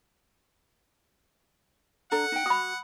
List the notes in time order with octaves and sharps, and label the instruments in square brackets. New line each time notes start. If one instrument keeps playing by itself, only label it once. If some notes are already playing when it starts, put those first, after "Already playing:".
[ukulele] D4 A4 A#5 [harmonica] F#5
[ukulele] D#4 G5
[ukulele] F#4 [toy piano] B5 D#6